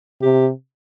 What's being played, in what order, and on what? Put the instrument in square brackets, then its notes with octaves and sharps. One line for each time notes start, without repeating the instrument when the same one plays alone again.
[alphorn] C3 [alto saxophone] G4